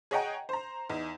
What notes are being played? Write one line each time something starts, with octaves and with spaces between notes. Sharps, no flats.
G#4 C#5 D#5 F#5 G5 A#5
C5 A#5
E2 D#4